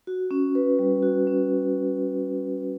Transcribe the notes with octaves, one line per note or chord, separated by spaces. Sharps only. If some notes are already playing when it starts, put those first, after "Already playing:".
F#4
C#4
B4
G3
F#4
C#4